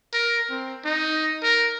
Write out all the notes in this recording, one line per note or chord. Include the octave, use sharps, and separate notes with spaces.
A#4
C4
D#4
A#4